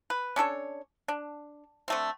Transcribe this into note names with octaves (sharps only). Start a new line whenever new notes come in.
B4
C#4 D4 A4 C#5
D4
D3 A3 C4